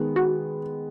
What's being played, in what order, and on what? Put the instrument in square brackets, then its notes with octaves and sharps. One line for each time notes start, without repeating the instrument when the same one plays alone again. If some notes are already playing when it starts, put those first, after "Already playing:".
Already playing: [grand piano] D#3 G#3 B3
[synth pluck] F#4